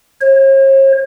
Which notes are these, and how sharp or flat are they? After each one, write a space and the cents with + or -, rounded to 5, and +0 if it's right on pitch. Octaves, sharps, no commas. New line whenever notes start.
C#5 -45